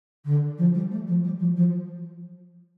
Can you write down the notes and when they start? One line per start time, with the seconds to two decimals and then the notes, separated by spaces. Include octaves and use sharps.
0.25 D3
0.58 F3
0.74 G3
0.91 A3
1.07 F3
1.23 G3
1.39 F3
1.56 F3